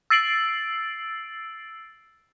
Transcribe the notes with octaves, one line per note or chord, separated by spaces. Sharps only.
E6 A6 C7 D7 F#7